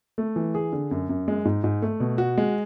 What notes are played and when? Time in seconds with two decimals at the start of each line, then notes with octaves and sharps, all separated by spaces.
0.18 A3
0.36 E3
0.55 G#4
0.73 D3
0.91 F#2
1.09 F#2
1.28 G#3
1.45 G#2
1.64 G#2
1.82 A3
2.00 B2
2.18 F#4
2.38 G#3